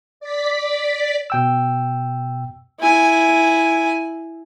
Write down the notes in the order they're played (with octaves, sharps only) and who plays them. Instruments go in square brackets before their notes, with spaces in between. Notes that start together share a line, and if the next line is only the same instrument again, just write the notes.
[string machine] D5 B6
[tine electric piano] B2 G5 E6
[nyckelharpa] E4 G#5